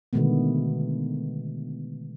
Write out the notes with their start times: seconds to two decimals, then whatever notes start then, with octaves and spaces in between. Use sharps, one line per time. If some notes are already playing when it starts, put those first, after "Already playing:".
0.13 B2 D3 D#3 G#3 A3 B3